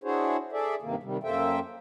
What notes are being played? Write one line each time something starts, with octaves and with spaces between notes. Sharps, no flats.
D4 E4 F#4 G#4 C5 C#5
G#4 A4 D5 E5
G2 C3 D#3 A#3
C3 D#3 G3
F#2 A#3 A4 C5 E5 G5